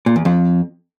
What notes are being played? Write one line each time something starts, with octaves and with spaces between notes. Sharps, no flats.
A#2
E2
F2